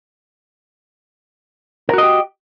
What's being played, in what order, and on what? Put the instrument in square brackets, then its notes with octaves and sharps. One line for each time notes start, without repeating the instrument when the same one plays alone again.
[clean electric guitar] A#4
F#4
D#5
G4